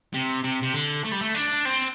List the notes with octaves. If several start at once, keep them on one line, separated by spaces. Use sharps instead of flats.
C3
C3
C3
D3
A3
G3
A3
D4
C4